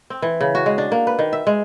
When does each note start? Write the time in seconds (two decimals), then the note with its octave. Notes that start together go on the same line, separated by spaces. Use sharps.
0.10 C4
0.22 E3
0.41 C#3
0.55 F#4
0.66 G#3
0.78 D4
0.92 A#3
1.07 B4
1.19 D#3
1.33 E5
1.47 G#3